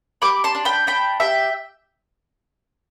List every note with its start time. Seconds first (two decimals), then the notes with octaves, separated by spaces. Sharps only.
0.22 G4 B5 D6
0.44 A5 C6
0.55 D4
0.65 G5 B5
0.87 D4 G5 B5
1.20 G4 E5 G5